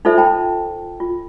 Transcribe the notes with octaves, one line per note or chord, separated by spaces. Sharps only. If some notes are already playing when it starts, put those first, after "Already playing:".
D#4 F4 A4 C5 E5
G5 A5 B5
F4